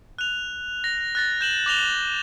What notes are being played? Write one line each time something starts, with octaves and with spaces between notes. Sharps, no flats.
F#6 F7
A#6
F#6 A6 A#6
G6 E7 F#7
D6 A#6 F7 G7